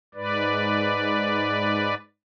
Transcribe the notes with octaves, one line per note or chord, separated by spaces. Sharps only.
G#2 B4 D5